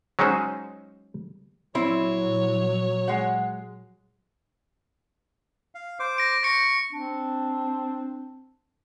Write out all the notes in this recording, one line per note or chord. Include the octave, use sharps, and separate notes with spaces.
F#3 G#3 C#4 D#4 C5
A#2 F#3 C4 E4 C#5 E5
G#3 F#5
F5
C5 D6
A#6 D7
C#6 A#6 C#7
C4 D4